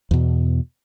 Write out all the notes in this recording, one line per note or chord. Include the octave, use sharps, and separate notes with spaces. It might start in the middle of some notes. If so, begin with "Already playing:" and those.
E2 B2